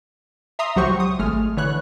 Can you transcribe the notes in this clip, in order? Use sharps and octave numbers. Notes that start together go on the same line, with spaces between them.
E5 A#5 C6 D#6
C#2 F#3 F#4 G4 C5 C#6
D#6
G#1 G#3 A3 F6
D3 E3 C#5 F#6